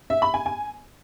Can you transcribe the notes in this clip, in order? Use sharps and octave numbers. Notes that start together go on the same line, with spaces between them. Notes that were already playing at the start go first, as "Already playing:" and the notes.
E5
B5
G#5
G#5